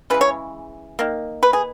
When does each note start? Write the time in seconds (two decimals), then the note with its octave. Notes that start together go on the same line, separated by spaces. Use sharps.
0.10 C#3 E3 G#3 B4
0.21 C#5
0.99 D#3 A#3
1.43 B4
1.53 G#4